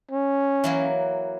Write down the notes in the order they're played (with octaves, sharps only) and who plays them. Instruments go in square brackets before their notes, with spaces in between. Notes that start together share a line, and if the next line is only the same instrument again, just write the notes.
[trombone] C#4
[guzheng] E3 F#3 A#3